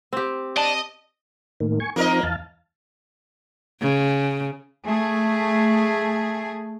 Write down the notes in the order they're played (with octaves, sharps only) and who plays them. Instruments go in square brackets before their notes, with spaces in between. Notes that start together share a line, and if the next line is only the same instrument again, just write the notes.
[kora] C4 G4
[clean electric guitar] D5 A5 [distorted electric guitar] D#5
[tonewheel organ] A2 D#3 A#3
G#5 C#6
[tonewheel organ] F3 C4 D#4 [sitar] A#3 A#4 D#5
[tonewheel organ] E2 F5 A5
[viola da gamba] C#3
[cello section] A3 G#4